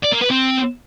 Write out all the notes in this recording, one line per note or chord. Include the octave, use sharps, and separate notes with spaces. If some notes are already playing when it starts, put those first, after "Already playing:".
D5
A#3
B4
C4